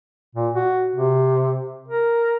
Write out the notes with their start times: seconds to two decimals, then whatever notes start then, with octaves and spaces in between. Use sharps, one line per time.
0.35 A#2
0.55 F#4
0.95 C3
1.88 A#4